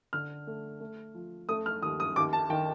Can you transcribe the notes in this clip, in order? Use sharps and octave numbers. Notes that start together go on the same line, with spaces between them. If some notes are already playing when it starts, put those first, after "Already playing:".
D3 F6
A3
A3
F3
A3 D#6
F6
D#2 D#6
D#6
D#2 D6
A5
D#3 G5